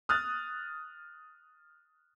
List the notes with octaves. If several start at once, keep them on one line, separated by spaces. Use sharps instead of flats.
D#6 F6 F#6 A6